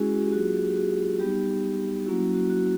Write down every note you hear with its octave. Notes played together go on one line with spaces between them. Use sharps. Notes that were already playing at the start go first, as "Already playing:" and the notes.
Already playing: G#3 C#4 E4 F#4 G#4
F#4
G4
F#3 A#3 D4 F4 F#4 G#4
G4
F#4 G#4
G3 B3 D#4 G4
F#3 A#3 C#4 E4 F#4
F#4
F#4